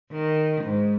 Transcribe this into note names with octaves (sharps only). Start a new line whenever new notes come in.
D#3
G#2